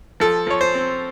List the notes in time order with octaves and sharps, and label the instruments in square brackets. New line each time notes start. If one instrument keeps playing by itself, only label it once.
[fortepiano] F3 A4
F3 C#5
C5
C4